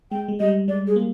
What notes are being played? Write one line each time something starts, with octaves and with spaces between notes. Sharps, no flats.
G#3 G5
G#3
G3 D#5
G#3 D5
G#4
A#3